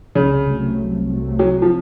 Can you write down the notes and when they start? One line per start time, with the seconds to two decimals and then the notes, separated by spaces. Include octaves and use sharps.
0.15 C2 C#3
0.47 C3 F#3 A3
0.78 C2
1.08 C3 F#3 A3
1.39 C3 F#3
1.62 F3